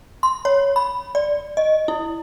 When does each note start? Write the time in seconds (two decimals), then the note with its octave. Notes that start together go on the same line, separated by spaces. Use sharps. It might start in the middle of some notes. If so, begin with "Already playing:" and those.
0.23 C6
0.45 C#5
0.76 B5
1.15 D5
1.57 D#5
1.88 E4